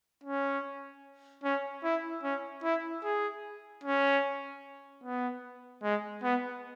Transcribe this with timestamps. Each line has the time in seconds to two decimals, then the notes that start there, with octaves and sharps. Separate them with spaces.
0.23 C#4
1.44 C#4
1.83 E4
2.23 C#4
2.63 E4
3.03 G#4
3.83 C#4
5.03 B3
5.83 G#3
6.23 B3